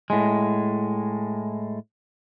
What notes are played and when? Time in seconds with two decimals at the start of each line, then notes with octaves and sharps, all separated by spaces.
0.10 A2 G#3